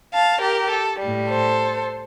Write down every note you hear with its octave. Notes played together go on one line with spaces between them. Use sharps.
F5 A5
G4 A#4
A4
A2 G3
A4 C5